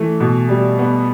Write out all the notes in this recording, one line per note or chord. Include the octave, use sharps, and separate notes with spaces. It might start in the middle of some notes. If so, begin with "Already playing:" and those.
Already playing: E3 A3
B2
G3
B3